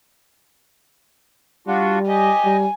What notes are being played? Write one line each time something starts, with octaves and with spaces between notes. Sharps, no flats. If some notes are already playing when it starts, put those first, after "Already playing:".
G3 D4 F4 F#4
G4 D#5 G#5
G3